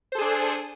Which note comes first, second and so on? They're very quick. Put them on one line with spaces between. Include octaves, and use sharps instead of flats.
C5 A4 G#4 D4